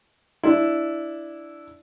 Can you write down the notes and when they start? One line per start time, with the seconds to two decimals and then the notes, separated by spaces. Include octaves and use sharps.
0.43 D4 E4